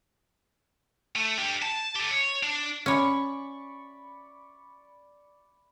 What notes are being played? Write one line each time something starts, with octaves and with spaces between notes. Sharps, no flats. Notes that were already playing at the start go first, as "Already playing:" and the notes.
A3
D4 G4
A5
G4 A4
C#5
D4
C#4 C#5 D5 B5 C#6